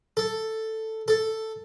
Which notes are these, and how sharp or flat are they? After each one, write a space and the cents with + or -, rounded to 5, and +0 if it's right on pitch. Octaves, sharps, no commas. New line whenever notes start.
A4 +5
A4 +5